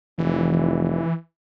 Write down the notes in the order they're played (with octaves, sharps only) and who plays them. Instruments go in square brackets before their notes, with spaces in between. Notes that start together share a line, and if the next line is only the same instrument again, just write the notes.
[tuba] F1 [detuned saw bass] E3